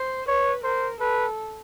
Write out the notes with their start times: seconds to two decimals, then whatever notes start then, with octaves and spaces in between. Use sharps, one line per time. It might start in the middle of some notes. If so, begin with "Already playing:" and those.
Already playing: C5
0.28 B4 C#5
0.64 A#4 C5
1.00 A4 B4